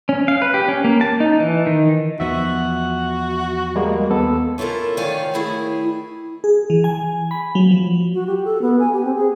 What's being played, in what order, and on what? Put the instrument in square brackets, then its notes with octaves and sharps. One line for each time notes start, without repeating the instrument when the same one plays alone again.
[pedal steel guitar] C#4
F5
B4
G4
C#4
A#3
A5
D#4
E3
D#3
[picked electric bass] E2 F3 B3 [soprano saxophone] F#4 [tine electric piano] E5
[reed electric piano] G3 [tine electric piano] G#3 A#3
[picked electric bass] D#2 [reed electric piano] B3 [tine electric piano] A4
[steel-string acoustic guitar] C#3 E4 F4 A4 A#4
D2 D#3 C#5 D5 F5 G#5
D#3 A3 E4 G#4
[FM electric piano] G#4
E3
G#5
B5
F#3
F3
[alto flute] F#4
G4
A4
B3
G#5
G4
C4
G#4